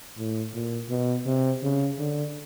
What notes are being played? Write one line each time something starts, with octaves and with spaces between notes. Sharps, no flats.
A2
A#2
B2
C3
C#3
D3